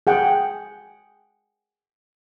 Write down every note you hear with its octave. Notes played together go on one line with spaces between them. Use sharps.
G#4 F#5 G5